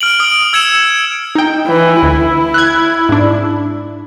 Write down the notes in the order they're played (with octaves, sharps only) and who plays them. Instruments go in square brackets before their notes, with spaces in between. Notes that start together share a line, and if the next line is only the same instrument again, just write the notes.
[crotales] F6 D7 F#7
D#6 D7
E6 G#6 C#7 E7
[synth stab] D#4 G5
[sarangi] E3
[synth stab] D2 [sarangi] E4
[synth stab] F#6 G#6
G#2 D4